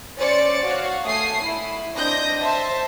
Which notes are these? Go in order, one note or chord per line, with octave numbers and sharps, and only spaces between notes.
C#4 C5 D5 A6 C#7
F#4 C#5 F5
A3 G#5 D#6 C7
E4
C4 D4 D#5 G6 A#6
C5 E5 A5